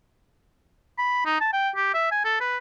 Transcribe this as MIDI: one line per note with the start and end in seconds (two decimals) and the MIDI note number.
0.98 1.22 83
1.25 1.40 63
1.40 1.51 81
1.53 1.69 79
1.76 1.93 67
1.94 2.10 76
2.11 2.21 80
2.24 2.36 69
2.40 2.57 71